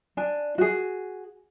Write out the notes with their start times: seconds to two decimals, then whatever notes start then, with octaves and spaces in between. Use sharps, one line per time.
0.17 D4 G#5
0.58 F#4 G#4